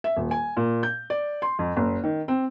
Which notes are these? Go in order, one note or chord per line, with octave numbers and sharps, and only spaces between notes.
E5
D#1
G#5
A#2
G6
D5
C6
F2
F#1
D#3
C4